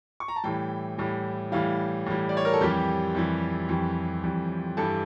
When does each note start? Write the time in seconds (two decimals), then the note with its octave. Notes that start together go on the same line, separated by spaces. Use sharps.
0.20 C#6
0.28 A#5
0.36 A5
0.44 A2 E3 G3 G5
0.98 A2 E3 G3
1.52 A2 E3 G3 F5
2.06 A2 E3 G3
2.29 D5
2.37 C#5
2.45 A#4
2.53 A4
2.61 F2 E3 G3 G4
3.15 F2 E3 G3
3.69 F2 E3 G3
4.23 F2 E3 G3
4.77 G2 E3 G3 A4